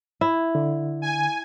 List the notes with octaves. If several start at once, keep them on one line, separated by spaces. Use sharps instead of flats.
E4
D3
G#5